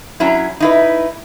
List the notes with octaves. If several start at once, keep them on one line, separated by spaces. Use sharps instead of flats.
F#3 C#4 E4
D#4 E4 B4